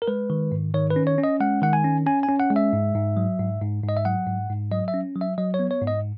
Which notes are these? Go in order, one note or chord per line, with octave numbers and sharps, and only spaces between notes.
A#4
G#3 B4
D#3
G#2
D#3 C#5
B4
C#4
C#5
C#4
D#5
G#3 F#5
D#3 F#5
G#5
C#4
C#4 G#5
G#5
C#4
F#5
G#3
E5
G#2
G#2
F#3
G#2
G#2
G#2
D#5
E5
F#3 F#5
G#2
G#2
F#3 D#5
E5
C#4
F#3
E5
F#3 D#5
C#5
B3
C#5
G#2
D#5